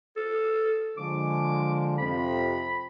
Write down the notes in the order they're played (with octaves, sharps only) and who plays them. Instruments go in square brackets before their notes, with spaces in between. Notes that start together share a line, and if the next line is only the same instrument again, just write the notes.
[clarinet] A4
[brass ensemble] D3 F3 G#3 [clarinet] D6
[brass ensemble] F2 C3 [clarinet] B5